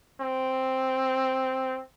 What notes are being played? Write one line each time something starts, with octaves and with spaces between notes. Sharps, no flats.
C4